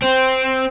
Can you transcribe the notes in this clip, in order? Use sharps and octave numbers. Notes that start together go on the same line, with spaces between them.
C4